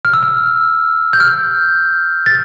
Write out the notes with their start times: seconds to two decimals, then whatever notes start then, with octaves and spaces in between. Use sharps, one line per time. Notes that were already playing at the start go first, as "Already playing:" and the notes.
0.05 F6
0.13 E6
0.23 F6
1.13 G6
1.20 F6
2.26 A6